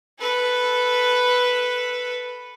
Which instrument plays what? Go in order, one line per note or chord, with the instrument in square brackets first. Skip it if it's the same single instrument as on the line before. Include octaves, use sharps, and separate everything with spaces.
[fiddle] A4 B4